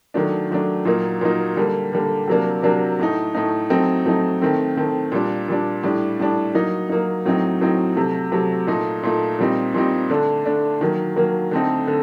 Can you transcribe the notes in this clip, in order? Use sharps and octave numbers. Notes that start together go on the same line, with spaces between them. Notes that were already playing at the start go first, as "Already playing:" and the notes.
D#3 F#3 A3 D4
D#3 F#3 A3 D4
A#2 F#3 A#3 D#4
A#2 F#3 A#3 D#4
D3 G3 A#3
D3 G3 A#3
C3 F#3 A#3 D4
C3 F#3 A#3 D4
A2 A3 D#4
A2 A3 D#4
F#3 A3 C4 D#4
F#3 A3 C4 D#4
D#3 A3 C4
D#3 A3 C4
A#2 G3 D4
A#2 G3 D4
A2 G3 D4
A2 G3 D4
F#3 A#3 D#4
F#3 A#3 D#4
A2 F#3 C4 D#4
A2 F#3 C4 D#4
C3 F#3 A3
C3 F#3 A3
A#2 A3 D#4
A#2 A3 D#4
A#2 G3 C4 D#4
A#2 G3 C4 D#4
D3 A3 D4
D3 A3 D4
D#3 F#3 A#3
D#3 F#3 A#3
D3 A3 C4 D#4
D3